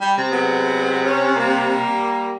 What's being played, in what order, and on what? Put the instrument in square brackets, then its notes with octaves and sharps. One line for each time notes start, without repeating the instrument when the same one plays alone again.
[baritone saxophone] G3
C3
[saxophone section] F#3 G#3 B3
C#4
G3 A#3